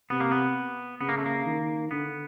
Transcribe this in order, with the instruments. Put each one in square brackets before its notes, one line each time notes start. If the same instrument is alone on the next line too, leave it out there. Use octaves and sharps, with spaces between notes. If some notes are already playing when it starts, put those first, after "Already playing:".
[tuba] C3 [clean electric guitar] B3
[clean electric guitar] A#3
B3
[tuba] C#3 [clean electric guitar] B3
[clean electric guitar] A#3
A3
A#3
[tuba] D#3
[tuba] D3 [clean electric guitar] B3